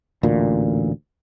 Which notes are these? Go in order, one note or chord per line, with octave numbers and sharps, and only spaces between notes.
A1 D2 A#2